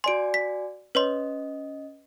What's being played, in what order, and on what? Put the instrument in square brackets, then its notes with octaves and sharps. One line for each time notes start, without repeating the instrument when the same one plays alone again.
[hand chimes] F#4 D5 G#5 [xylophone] C6 D7
[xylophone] B6
[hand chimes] C#4 D#5 [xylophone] B4 C#5 C6